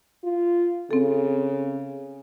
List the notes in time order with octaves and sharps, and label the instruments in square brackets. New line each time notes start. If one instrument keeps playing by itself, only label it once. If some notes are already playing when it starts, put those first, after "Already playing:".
[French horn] F4
[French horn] C#3 [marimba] C4 A4